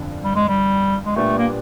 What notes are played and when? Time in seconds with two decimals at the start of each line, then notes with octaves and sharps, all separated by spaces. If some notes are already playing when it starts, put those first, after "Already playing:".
Already playing: G1 F2 D3
0.24 G3
0.36 G#3
0.48 G3
1.06 G#3
1.16 A#2 G3 A3 B3 D4 G4
1.38 A#3